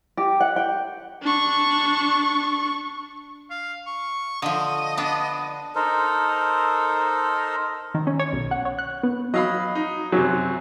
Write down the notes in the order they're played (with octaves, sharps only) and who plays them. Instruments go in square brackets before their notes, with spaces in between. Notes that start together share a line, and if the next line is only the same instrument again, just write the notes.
[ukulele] G4
F#5
G5
[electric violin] D4 C#6
[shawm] F5
C#6
[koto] D3 F3 [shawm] D#5
[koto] B3 D4
[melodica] D#4 A4 A#4 C5
[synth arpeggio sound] D#3
C#4
C#5
B1
F#5
C#5
F#6
B3
[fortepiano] F#3 [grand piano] D#5 F5 B5
[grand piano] D#4
[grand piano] F#2 C3 [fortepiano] F#3